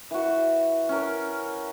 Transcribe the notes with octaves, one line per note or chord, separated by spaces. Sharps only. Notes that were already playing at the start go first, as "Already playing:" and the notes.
E3 F#4
C#4 A#4